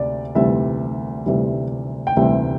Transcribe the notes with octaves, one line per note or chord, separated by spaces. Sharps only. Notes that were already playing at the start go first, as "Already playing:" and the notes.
Already playing: D2 C3 D5
D2 C3 E3 G3 E5
D2 C3 E3 G3
G5
D2 C3 E3 G3 E5